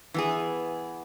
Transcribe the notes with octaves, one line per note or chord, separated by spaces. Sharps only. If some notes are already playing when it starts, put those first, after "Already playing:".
E3 B3 G#4